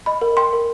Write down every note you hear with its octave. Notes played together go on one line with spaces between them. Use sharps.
D#5 B5
A#4
G5 C6
A#4